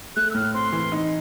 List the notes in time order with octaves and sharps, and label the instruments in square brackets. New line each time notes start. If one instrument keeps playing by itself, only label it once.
[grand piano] A3 [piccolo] F#6
[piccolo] E6
[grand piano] A2 [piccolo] F6
[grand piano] C4 [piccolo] C6
[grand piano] E3
D#4